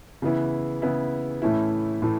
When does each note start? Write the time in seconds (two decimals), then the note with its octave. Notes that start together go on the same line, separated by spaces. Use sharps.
0.22 C#3 E3 B3 E4
0.82 C#3 E3 B3 E4
1.42 A2 E3 A3 C#4 E4
2.02 A2 E3 A3